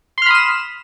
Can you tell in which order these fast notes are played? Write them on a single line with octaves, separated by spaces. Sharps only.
C6 F6 B5 D#6 E7